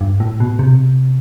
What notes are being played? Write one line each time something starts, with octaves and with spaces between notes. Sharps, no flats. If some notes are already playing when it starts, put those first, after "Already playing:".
G2
A2
B2
C3